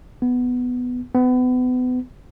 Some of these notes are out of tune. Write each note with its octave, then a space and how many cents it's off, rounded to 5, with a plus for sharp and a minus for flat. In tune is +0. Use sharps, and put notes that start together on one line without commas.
B3 +5
B3 +30